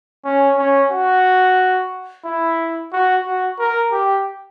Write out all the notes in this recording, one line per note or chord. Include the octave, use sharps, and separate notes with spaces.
C#4
C#4
F#4
E4
F#4
F#4
A#4
G4